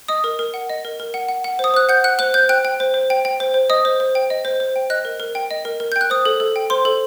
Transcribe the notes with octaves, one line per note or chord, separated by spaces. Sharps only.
D#5 D#6
A#4
A#4
F#5
D#5
A#4
A#4
F#5
F#5
F#5
C5 D#6
C5 F#6
F#5 G6
F#5 F#6
C5 F#6
C5 G6
G5 F#6
G5
C5
C5
G5
G5
C5
C5
D#5 D#6
C5
C5
G5
D#5
C5
C5
G5
D#5 F#6
A#4
A#4
G5
D#5
A#4
A#4
G5 G6
F#6
C5 D#6
A4
A4
G5
C5 C6
A4